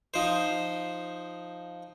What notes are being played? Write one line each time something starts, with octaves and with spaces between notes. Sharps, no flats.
F3 D#4 C5